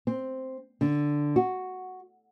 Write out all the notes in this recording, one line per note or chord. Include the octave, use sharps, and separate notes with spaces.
C4
D3
F#4